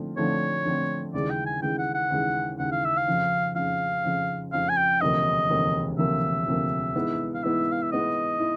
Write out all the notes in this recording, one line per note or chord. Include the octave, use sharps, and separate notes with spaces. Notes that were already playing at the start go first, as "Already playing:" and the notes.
Already playing: D3 F3 A3 C4
D3 F3 A3 C4 C#5
D3 F3 A3 C4
D#2 C#3 E3 G#3 D5
G5
G#5
D#2 C#3 E3 G#3 G5
F#5
F#5
D#2 C#3 E3 G#3
D#2 C#3 E3 G#3 F#5
F5
E5
F5
F2 C#3 F3
F2 C#3 F3 F5
F2 C#3 F3
F2 C#3 F3 F5
G#5
G5
E1 D2 C3 F3 A#3 D#5
E1 D2 C3 F3 A#3
E1 D2 C3 F3 A#3 E5
E1 D2 C3 F3 A#3
G#2 E3 G#3 B3 E4
F5
G#2 E3 G#3 B3 E4 E5
F5
E5
G#2 E3 G#3 B3 E4 D#5
E4